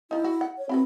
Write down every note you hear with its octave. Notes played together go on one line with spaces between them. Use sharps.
F3 D#4 E4
F#4
F#5
C#5
C4 E4 F#4 B4